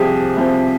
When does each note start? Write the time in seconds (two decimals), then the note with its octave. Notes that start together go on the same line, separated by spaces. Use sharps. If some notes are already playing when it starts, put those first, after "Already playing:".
Already playing: C2 C3 F3 C4 G4 G#4
0.37 C2 C3 F3 C4